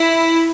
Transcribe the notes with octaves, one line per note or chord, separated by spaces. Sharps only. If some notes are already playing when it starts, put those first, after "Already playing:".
Already playing: E4